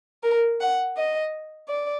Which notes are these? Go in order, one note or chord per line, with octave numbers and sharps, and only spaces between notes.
A#4
F#5
D#5
D5